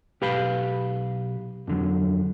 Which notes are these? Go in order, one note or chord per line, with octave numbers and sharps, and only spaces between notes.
B1 G4 B4 F5 B5
F2 D3 F#3